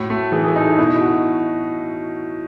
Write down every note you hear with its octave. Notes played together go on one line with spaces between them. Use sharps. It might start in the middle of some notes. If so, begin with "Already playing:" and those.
Already playing: A2 F#4
A3
E3 G#4
G#4
A4
D#4
B2 E4
F#4